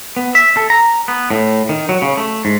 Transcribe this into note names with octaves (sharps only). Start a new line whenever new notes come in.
B3
E5
A4
A#5
B3
A2
D#3
F#3
C#3
A3
G#2